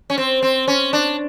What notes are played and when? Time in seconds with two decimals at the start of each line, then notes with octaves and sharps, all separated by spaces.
0.10 C#4
0.18 C4
0.42 C4
0.68 C#4
0.93 D4